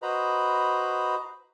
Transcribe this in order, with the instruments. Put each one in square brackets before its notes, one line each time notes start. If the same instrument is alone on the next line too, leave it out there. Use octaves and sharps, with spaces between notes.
[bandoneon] F#4 B4 C5 D#5 A#5 B5